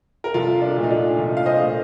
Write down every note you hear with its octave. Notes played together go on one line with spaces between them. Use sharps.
A#4
C2 F4 A4
D4
A#2 A3
D#4
D4 F4
C2
F5
C5 D#5
A#2 A3